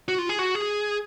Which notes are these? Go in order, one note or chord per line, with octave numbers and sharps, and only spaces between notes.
F#4
F4
G#4
F#4
G#4